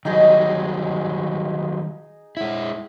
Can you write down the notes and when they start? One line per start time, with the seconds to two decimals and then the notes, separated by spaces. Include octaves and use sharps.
0.05 D#3 F#3 G3 D#4 G#4 D#5
2.37 G#3 E4